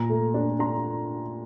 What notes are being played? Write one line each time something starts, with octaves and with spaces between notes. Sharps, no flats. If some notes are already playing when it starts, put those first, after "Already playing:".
Already playing: A#2 A#5
A3
D4
D4 A#5 C6